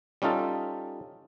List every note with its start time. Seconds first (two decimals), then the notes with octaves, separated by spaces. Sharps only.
0.22 G3 C#4 D#4 F4 A4